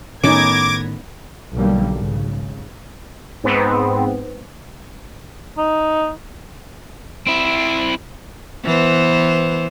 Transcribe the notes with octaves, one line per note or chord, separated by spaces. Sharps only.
A2 D#3 B3 C#4 D#4 D6 G#6 A#6
B1 D3 F#3 G3 A#3
G#1 C#3
G#2 B3 C4
D#4
C4 E4
E3 B3 C5